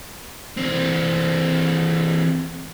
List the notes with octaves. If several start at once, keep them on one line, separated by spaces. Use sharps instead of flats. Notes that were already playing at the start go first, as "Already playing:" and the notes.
E3 C4